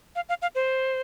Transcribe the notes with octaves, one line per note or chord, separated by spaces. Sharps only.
F5
F5
F5
C5